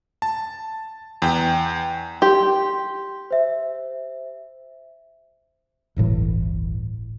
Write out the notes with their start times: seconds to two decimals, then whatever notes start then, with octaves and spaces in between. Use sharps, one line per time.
0.22 A5
1.22 E2 G5
2.22 G4 C6
3.31 C5 E5
5.96 D1 G1 A2 E3